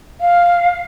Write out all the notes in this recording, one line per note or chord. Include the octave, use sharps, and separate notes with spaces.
F5